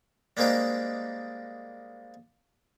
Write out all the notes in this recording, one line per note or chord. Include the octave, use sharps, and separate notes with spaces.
G3 G#3 A#3 C4 D4 D#4